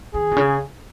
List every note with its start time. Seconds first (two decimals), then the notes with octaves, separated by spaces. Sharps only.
0.14 D#3 G#4
0.31 B2
0.37 C#3